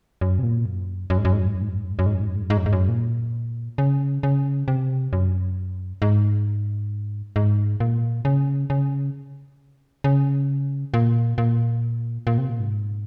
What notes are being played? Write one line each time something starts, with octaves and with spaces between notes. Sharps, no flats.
F#2
C3
A#2
F#2
F#2
G#2
F#2
G#2
F#2
G#2
F#2
G#2
F#2
G#2
F#2
G#2
F#2
G#2
F#2
G#2
F#2
G#2
F#2
G#2
F#2
G#2
F#2
A#2
C#3
C#3
C3
F#2
G#2
G#2
A#2
C#3
C#3
C#3
A#2
A#2
A#2
C3
A#2
G#2